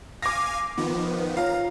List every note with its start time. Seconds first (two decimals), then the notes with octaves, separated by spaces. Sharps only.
0.22 F5 G#5 D6 A#6
0.78 D#3 F3 B3
1.37 F4 C#5 F5 A#5